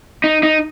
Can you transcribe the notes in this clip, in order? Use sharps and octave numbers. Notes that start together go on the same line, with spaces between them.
D#4
D#4